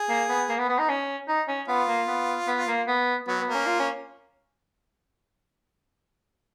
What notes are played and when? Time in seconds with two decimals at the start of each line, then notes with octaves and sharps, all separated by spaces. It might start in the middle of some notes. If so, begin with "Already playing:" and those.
Already playing: G#4
0.09 A#3
0.29 B3
0.49 A#3
0.59 B3
0.69 B3
0.79 D#4
0.89 C#4
1.28 D#4
1.48 C#4
1.68 B3 F4
1.88 A#3
2.08 B3
2.48 B3
2.68 A#3
2.88 B3
3.28 F#3 B3
3.41 B3
3.48 A#3
3.54 C#4
3.67 F4
3.80 C#4